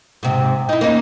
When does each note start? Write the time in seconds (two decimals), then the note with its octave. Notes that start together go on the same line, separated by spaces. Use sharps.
0.23 G#2 C3
0.69 D#4 E4
0.81 A#3 C#4 D#4